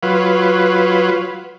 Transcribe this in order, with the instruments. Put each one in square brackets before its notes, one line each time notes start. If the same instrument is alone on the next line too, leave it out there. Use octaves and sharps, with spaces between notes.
[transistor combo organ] F#3 F4 B4